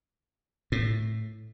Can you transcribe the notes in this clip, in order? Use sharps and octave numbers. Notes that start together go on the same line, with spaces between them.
A2